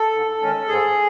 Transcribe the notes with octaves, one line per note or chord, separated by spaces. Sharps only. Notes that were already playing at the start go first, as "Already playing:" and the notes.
Already playing: A4
G#2
D#3 G#3 C#4
G#2 G#4